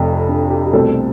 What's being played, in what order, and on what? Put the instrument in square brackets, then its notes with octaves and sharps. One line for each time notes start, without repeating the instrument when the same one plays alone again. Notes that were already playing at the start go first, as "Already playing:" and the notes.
Already playing: [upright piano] F1 F2 C3
D4
G4
G4
C2 B2 A3 C4 A4